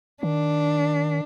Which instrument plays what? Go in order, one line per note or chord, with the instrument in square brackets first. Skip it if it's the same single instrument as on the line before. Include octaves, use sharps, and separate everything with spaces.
[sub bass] D#3 [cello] D4